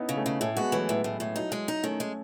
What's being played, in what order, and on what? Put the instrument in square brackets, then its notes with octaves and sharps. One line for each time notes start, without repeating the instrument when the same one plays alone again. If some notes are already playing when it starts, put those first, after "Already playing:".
Already playing: [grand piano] B3 C#4 D#4 E4
[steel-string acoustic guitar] C#3
[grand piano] A3 C#4
[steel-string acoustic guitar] C#3
[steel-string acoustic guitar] A2 [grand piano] A3 C#4
[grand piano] G#3 B3 [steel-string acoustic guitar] F#4
[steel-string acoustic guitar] E3 [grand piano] F#3 A3
[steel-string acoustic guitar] A2 [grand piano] F#3
[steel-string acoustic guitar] A2
A2
[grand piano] F#3 [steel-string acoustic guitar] D#4
[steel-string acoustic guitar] G#3
D#4
[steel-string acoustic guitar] D#3 [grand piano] A3 C#4
[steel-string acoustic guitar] G#3